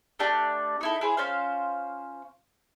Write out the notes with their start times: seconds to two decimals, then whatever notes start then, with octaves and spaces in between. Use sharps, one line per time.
0.19 A3 D4 G4 D5
0.81 D#4 E4 A4
1.01 E4 G#4 C5
1.17 C#4 F4 C5 F5